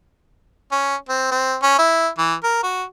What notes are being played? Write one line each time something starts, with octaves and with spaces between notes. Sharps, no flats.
C#4
C4
C4
C#4
E4
E3
A#4
F#4